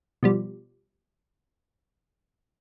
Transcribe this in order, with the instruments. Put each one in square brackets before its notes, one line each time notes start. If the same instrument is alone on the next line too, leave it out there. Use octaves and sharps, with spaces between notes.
[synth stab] B2 F3 G3